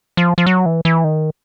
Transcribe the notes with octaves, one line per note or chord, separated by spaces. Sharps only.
F3
F3
F#3
E3
E3
D#3